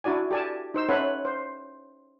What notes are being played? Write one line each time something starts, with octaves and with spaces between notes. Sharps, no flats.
D4 E4 F#4 D5 G#5
G4 A4 D5 G#5 A5
D#4 C5 E6
C#4 A4 B4 C#5 E5 F#5
C5